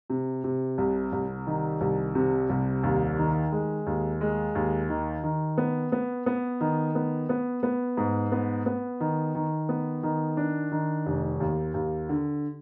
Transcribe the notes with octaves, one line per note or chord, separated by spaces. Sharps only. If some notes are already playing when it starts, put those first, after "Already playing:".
C3
C3
C2
C2
D#3
C2
C3
C2
D#2
D#3
G#3
D#2
G#3
D#2
D#3
D#3
B3
B3
B3
D#3
B3
B3
B3
G#2
B3
B3
D#3
D#3
B3
D#3
D4
D#3
F1
D#2
D#2
D3